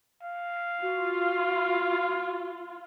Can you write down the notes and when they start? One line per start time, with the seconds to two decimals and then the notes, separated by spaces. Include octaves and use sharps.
0.23 F5
0.82 F4 F#4